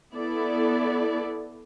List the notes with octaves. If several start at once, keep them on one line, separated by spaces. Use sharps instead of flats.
B3 E4 A4 D5